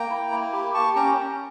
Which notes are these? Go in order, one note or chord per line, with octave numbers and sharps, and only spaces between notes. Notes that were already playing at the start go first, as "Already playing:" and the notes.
Already playing: A#3 G5 A#5
E4
A#3
G4
G4 A5 C#6
C#4 G5 A#5